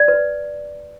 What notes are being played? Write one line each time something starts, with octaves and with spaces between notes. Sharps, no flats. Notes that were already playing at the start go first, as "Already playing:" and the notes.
Already playing: D5
B4